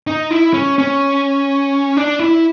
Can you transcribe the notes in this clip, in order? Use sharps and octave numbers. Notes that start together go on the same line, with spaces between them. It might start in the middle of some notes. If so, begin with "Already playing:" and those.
D#4
E4
C#4
C#4
D4
E4